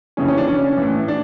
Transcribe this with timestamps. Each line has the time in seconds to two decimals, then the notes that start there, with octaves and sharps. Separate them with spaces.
0.17 F2 C#3 E3 C#4
0.28 C#4
0.37 D4
0.47 C#4
0.77 A2 E3
1.08 D4